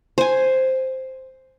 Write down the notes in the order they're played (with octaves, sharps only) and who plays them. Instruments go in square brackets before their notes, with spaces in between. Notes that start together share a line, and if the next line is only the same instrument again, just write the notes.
[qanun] C5 G#5